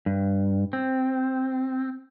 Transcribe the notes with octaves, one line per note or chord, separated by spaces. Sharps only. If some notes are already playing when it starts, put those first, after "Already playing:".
G2
C4